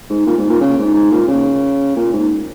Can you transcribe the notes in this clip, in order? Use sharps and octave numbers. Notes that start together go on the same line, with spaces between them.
G#2
A#2
G#2
A#2
C#3
G#2
G#2
A#2
C#3
A#2
G#2